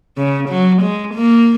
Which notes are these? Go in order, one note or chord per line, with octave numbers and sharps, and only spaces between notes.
C#3
F#3
G#3
A#3